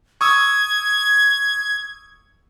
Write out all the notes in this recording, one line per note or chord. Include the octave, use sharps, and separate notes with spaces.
C#6 D#6 E6 G#6